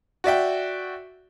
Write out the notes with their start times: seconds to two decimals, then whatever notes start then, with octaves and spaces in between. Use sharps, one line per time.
0.24 F#4 D5 E5 G5